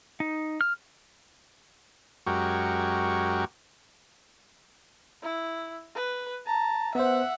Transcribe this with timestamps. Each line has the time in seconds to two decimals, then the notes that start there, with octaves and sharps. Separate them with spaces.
0.20 D#4
0.61 F6
2.27 F#2 G#3 F#4 G4 A#4 C#6
5.23 E4
5.95 B4
6.46 A5 A#5
6.95 B3 C5 E5 F#5